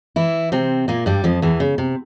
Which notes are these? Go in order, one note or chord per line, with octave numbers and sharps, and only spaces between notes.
E3 E4
C3 C4
A#2 A#3
G2 G3
F2 F3
E2 E3
C#3
C3